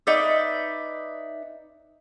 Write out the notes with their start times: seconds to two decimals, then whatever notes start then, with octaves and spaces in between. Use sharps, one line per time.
0.07 D#4 B4 D5 E5